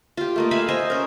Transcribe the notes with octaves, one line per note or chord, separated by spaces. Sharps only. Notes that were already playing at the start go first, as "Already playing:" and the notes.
F4 G4
A3 A#3 D#5
E5 F5 G#5 B5
C5 D#5 G#5
C#4 A#4